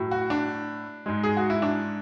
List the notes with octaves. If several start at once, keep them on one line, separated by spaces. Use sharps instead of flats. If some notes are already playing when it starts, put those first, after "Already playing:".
Already playing: A2 F#3
F#4
D4
G#2 G#3
G#4
F#4
E4
D4